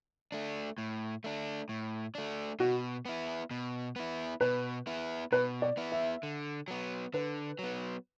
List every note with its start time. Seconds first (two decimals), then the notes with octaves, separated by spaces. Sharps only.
0.32 A3 D4
0.78 A2
1.24 A3 D4
1.69 A2
2.15 A3 D4
2.60 B2 F#4
3.05 B3 E4
3.51 B2
3.96 B3 E4
4.41 B2 B4
4.87 B3 E4
5.32 B2 B4
5.62 D5
5.77 B3 E4
5.92 E5
6.23 D3
6.68 F#3 B3
7.14 D3 B4
7.59 F#3 B3